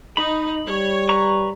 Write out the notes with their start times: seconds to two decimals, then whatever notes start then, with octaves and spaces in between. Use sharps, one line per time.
0.17 D#4 B5
0.67 G3 C#5
1.09 B4 A#5 C#6